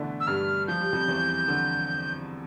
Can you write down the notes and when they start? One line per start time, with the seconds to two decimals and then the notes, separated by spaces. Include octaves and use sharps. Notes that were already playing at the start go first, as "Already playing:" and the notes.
Already playing: B2 D3 E3 A3 D4 E4
0.20 E6
0.27 G2 G3 F6
0.67 F3 G6
0.80 G3
0.93 F2 F3
1.08 E2 E3
1.48 D3